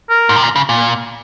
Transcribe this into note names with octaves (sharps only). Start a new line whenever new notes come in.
A#4
G#2
C3
A#2
C#3
A#2